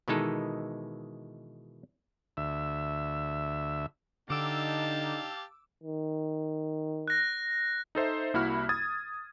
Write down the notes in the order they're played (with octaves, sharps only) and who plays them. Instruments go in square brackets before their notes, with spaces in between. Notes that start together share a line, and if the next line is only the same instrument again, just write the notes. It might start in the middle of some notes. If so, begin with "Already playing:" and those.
[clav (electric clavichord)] B2 D#3 E3 G#3 D#4 A4
[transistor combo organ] D2 E5
[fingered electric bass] D3 [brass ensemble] D4 D#4 [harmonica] G4 F5 A5 [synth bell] D6 E6
[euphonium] D#3
[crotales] F#6 A#6
[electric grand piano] D#4 A4 C5 E5
C2 A#3 E4 F#4 B5 F6
D#6 G#6 A6